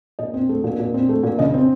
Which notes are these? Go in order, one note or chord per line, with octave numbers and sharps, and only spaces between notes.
A#2 D#5
C4
A3
A#2
A#2
C4
A3
A#2
C#3 D#5
C4